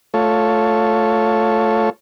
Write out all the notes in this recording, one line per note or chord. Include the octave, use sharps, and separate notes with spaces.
A3 F4 A4 C#5